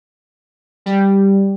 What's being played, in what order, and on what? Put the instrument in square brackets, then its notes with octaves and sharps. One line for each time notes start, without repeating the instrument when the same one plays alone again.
[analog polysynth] G3